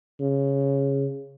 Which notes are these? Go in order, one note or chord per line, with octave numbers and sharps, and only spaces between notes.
C#3